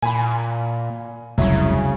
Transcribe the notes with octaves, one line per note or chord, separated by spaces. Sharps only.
A#2 G#5 B5
F1 C2 C#3 F#3 E4